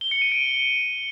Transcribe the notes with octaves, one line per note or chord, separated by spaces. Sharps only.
G7
C#7
D#7
D7